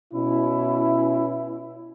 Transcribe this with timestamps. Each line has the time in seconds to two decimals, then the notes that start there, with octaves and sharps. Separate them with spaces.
0.14 B2 C#4 E4